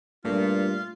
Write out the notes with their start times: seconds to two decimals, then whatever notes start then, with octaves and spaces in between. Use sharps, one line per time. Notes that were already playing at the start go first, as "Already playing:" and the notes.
0.25 G2 A#2 A3 F4